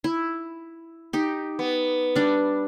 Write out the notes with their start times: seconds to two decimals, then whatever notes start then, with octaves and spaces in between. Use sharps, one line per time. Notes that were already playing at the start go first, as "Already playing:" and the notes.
0.04 E4
1.13 D#4 G4
1.59 B3
2.15 G3 D4